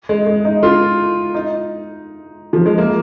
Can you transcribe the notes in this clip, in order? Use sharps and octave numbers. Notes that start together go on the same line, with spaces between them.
G#3
G#3
D#4
F4
D#4
F3
G#3
A#3